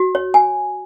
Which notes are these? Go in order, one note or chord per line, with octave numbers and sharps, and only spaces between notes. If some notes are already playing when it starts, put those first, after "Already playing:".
Already playing: F#4
C#5
G#5